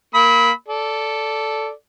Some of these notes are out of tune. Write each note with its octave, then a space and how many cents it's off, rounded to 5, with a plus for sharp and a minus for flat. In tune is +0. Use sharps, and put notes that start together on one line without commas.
A#3 +0 B5 +0 E6 -45
A4 +0 D5 -15